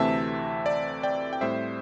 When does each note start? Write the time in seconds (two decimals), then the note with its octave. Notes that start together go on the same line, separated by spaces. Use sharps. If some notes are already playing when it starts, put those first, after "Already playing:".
Already playing: D2 C3 E3 A3 C4 E5 A5
0.66 D5
1.03 D5 G5
1.33 G5
1.41 A2 G3 C4 C5 E5